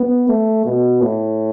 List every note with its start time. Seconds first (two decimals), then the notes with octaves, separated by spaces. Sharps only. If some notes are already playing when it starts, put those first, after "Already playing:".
Already playing: B3
0.29 A3
0.66 B2
1.01 A2